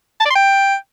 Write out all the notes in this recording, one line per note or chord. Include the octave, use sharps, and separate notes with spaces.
A5
D5
C6
G5